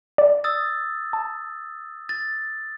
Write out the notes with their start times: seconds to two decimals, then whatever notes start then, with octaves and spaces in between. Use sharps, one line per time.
0.18 D5
0.44 D#6 E6 A6
1.13 A5
2.09 A6